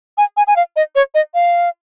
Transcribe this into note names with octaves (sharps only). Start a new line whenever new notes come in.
G#5
G#5
G#5
F5
D#5
C#5
D#5
F5